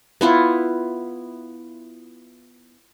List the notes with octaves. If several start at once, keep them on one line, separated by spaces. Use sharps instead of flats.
B3 E4 F4